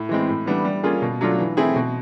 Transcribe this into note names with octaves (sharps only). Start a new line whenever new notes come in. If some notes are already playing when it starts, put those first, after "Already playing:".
Already playing: A2
E3 G#3 C4
A2
E3 G3 B3 D4
G3
A#3 C#4 F4 G#4
B2
F#3 A3 D4 F4
E3
A3 C4 E4 G#4
B2